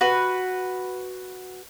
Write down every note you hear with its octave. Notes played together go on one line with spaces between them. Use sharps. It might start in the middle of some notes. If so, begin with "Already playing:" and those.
F#4 B4